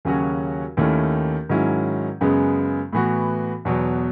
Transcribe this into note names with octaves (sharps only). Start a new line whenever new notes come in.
D#2 C#3 F#3 C#4 F#4
D#2 D#3 A3 C#4 E4
G#2 D#3 F#3 C#4 E4
F#2 C#3 G#3 B3
A2 E3 B3 F#4
E2 B2 F#3